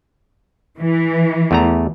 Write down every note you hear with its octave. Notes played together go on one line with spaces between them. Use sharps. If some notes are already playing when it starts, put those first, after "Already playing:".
E3
E2 A3 A#5